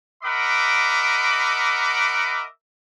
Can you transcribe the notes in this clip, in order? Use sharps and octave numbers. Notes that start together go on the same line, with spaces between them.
A#4 D#5 E5 F#5 B5 D6